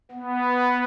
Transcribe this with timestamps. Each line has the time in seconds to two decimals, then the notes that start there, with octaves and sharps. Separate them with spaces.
0.12 B3